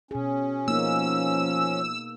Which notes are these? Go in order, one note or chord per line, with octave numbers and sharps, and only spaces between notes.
B2 C#4 G#4
F3 A#3 B3 D#4 E6